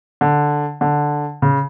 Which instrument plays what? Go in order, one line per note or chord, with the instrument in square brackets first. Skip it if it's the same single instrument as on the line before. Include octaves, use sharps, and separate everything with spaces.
[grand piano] D3
D3
C#3